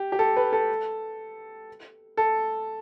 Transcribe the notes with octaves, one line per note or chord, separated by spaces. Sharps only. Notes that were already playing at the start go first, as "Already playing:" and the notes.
Already playing: G4
G4
A4
B4
A4
A4